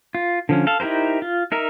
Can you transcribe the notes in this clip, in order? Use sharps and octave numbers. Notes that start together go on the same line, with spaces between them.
F4
D3 F3 C#4
A4 F5
D#4 E4 G4 A#4 C5
F4
D#4 A#4 E5